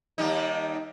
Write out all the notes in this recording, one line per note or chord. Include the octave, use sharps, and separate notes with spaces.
D#2 G3 D#4